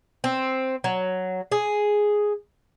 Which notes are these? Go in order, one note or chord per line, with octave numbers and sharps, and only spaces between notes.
C4
F#3
G#4